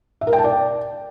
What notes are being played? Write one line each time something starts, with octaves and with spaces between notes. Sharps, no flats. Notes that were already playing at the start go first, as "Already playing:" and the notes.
E5
A#4
G5
A5
D5